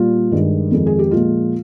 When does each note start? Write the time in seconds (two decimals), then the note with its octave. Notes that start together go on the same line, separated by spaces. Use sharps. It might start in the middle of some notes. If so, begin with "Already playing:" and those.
Already playing: A#2 G3 F4
0.31 G2 D#3 G#3
0.71 F2 D#3 G#3
0.87 G#4
0.99 G4
1.11 A#2 F3 G#3 F4